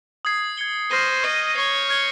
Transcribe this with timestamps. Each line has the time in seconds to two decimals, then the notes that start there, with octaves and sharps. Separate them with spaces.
0.25 D#6 G#6 C7
0.57 G#6 C#7 G7
0.91 C5 C#6 F6 A#6 D#7 G7
1.23 D#5 C#6 G6 C7
1.56 C#5 G#6 C7 G7
1.89 F6 G#6 C#7 G7